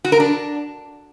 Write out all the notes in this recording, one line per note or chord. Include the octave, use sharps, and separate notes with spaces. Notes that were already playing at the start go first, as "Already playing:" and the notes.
F#4
A#4
D4